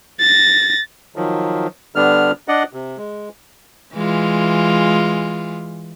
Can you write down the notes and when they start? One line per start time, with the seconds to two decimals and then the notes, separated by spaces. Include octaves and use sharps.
0.20 A6 A#6
1.16 D#3 F3 F#3
1.96 D3 G3 B3 D4 F6
2.48 D4 D5 D#5 F#5
2.73 C3
2.97 G#3
3.94 E3 G#3 F4